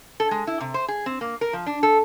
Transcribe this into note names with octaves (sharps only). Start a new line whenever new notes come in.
A4
G#3
E4
C3
C5
G#4
C4
A#3
A#4
F3
D4
A4